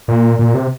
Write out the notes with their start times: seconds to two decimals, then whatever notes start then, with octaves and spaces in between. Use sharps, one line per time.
0.08 A#2
0.39 A#2
0.54 C3